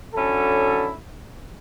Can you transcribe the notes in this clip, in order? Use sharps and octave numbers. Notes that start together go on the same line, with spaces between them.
D3 F#3 C#4 E4 A4